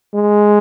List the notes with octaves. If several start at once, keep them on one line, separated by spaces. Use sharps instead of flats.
G#3